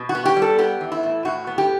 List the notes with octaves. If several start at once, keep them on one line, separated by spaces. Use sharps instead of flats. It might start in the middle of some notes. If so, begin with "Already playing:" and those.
Already playing: B2
F#4
B3
G4
G3
A4
B3 G4
E3
E4
A2
A2 F#4
B3
G4